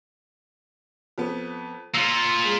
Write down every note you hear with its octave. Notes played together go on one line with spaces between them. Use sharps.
F2 B3
A#3 F4 E6 C7 C#7
G#3 F#7